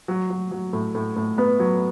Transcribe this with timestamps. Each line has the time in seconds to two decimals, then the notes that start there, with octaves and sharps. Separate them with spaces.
0.08 F#3
0.30 F#3
0.51 F#3
0.73 A2
0.95 A2
1.16 A2
1.38 B3
1.59 F#3